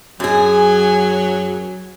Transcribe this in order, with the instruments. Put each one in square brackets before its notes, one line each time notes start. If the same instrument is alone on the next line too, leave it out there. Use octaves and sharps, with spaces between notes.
[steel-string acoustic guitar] F#2 G#4 [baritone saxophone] F#3 [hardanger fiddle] G#5